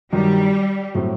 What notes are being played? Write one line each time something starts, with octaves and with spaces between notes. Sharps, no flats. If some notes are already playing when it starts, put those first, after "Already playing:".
G2 D#3 F#3 G3
A2 F#3 C4